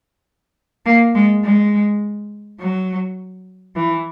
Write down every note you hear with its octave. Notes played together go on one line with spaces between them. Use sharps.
A#3
G#3
G#3
F#3
E3